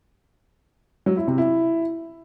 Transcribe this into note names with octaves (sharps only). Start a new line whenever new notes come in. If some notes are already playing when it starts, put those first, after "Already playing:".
F#3
E4
C3
E4